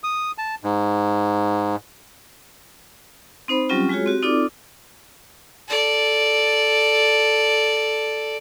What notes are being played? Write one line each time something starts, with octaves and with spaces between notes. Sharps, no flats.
D#6
A5
G#2
C4 D#4 C5 B5
F#3 G3 C4 C#4 F4 G4
G#3 F4 F#4 G#4 C#5
C4 F#4 G4
C4 D#4 F4 A4 D5 D6
A4 D5